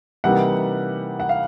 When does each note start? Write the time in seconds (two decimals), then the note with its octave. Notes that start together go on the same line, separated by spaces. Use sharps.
0.24 C3 E3 G3 A#3 D#4 F#5
1.20 F#5
1.29 F5